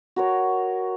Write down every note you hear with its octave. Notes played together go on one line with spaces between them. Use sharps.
F#4 A#4 C#5